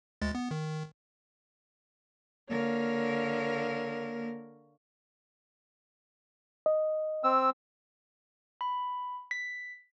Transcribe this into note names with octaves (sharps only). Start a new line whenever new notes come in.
D2 G#3 A6
B3
D#3
D3 A#3 A#4 C#5 F5
D#5
C4 E6
B5
B6